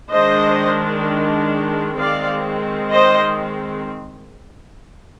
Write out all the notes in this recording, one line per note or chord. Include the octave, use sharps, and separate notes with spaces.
D#3 G#3 D4 C5 D#5
D#3 G#3 C4 D5 F5
C5 D#5